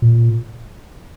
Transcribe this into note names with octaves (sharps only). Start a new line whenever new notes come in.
A#2